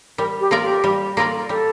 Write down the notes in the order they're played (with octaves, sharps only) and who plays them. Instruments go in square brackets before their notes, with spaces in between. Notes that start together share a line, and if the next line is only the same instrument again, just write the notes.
[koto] G3 [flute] A#4
[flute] G4
[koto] A#3 F4 A#4 D5
[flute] G4
[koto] G3
A#3 F4 A#4 D5
[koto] G3 [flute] A4